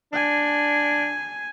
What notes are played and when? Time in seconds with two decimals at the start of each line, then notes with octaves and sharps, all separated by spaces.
0.13 D4 G#5